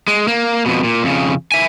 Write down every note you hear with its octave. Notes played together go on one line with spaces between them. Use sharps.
G#3
A#3
F2 B2
A#2
F2 C#3
E5 G#5